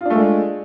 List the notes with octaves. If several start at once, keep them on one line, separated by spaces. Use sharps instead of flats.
G#3 A3 D4 F4